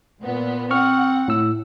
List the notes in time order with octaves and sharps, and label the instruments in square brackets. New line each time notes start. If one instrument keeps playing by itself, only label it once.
[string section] A#2 B3
[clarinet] C4 [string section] F#5 [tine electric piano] C#6 F6
[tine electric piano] A2 E6